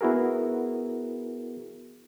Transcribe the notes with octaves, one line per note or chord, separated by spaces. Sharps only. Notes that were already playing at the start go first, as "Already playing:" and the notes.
B3 E4 F#4 G#4 A#4